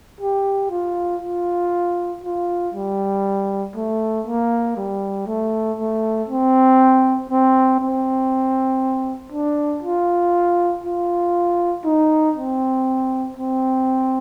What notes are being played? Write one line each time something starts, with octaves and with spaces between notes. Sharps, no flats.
G4
F4
F4
F4
G3
A3
A#3
G3
A3
A3
C4
C4
C4
D4
F4
F4
D#4
C4
C4